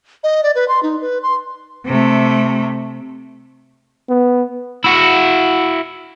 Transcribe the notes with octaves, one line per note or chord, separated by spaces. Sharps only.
D#5
D5
B4
C6
D#4
B4
C6
C3 A3
B3
E4 F#4